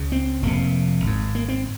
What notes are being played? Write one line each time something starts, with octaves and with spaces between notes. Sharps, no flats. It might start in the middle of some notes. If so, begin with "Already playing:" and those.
Already playing: C#2 C#3
C4
F1 F2 C3 A#3
G#1 G#2
A#3
C4